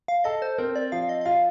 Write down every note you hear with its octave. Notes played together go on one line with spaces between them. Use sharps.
F5
A4 D#5
C5
C4 A#4
D5
F3 F5
D#5
D#5
F4 F5